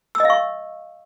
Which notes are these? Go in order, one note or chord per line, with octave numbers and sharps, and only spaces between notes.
D#5 F5 C#6 E6